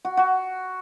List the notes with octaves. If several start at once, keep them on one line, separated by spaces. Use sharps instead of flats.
F#4
F#4